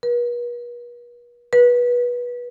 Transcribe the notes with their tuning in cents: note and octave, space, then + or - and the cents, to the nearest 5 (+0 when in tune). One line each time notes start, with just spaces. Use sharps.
B4 -45
B4 -20